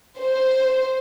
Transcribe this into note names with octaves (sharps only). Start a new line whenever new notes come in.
C5